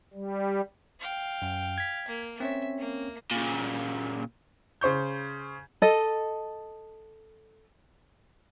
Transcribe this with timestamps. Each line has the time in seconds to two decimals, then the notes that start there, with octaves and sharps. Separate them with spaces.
0.13 G3
0.99 F5 G5
1.42 F#2
1.78 G#6 B6
2.08 A#3
2.40 C4 C#4 C#5 E5
2.78 A#3
3.31 A#2 C#3
4.81 C#3 C5 C#6 G6
5.82 A4 D#5